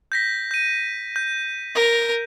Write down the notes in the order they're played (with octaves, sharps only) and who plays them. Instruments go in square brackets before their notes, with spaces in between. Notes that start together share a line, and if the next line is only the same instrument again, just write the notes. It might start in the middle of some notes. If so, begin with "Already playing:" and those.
[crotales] G6 A#6 B6
G6 D#7
G6
[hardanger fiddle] A#4